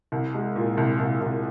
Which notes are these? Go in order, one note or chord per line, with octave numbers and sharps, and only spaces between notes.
C2
G#3
A#2
C2
C2
C2